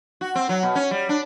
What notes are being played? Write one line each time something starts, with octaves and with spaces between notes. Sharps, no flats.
F#4
C4
F#3
B2
C#4
G3
D4